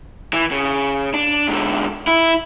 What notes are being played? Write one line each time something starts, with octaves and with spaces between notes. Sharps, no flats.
E3
C#3
D4
G#2 D3
E4